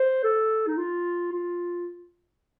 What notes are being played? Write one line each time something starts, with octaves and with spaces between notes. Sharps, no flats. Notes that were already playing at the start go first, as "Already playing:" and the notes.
Already playing: C5
A4
D#4
F4
F4